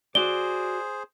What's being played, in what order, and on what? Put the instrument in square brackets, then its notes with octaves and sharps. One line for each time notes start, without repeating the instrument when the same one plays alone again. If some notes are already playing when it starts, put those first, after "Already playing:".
[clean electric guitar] F#4 D5 [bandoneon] G#4 C5 [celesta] G7